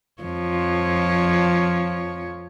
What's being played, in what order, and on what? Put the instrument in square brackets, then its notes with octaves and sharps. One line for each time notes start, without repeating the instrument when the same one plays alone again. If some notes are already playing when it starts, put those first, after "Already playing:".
[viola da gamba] F2 F3 C#5